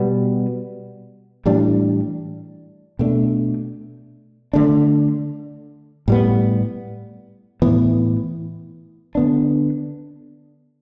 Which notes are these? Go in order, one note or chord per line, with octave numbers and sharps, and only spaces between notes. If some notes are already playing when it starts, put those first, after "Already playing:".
Already playing: B2 G3 B3
A2 E3 G3 D4
B2 A3 D4
D3 A3 D4
A2 G3 B3
A2 E3 B3
D3 B3 D4